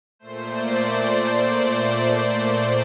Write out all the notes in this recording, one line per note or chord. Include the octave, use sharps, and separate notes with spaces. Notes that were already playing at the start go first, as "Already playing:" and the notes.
A#2 A3 C5
D5
C5
C5
D5